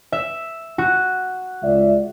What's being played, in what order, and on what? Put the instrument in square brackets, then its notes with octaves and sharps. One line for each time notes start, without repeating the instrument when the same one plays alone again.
[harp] E5
F#4
[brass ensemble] C#2 D5 E5